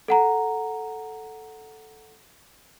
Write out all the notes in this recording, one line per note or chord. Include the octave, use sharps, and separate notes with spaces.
A4 F#5 A#5